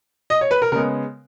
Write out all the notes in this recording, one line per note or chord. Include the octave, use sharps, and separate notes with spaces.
D#5
C#5
B4
A#4
C#3 G#3 B3 A#4